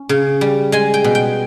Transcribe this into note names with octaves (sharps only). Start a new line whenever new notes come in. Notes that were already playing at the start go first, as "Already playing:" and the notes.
Already playing: C#4
C#3
G3
G#3 G#5
G5
B2
G5